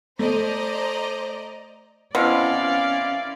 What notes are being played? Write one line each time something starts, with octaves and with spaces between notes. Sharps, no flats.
A3 C5 D5 D#5 A#5
B2 C4 C#4 E4 A#4 D5 F5